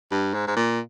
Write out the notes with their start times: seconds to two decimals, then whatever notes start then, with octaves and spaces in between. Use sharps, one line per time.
0.12 G2
0.34 G#2
0.48 G#2
0.56 A#2